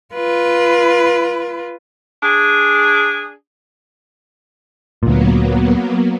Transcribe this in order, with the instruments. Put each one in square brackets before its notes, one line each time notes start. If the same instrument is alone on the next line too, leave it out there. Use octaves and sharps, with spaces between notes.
[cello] F4 B4
[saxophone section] D4 G#4
[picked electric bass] D2 A#2 [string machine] F#3 A#3 B3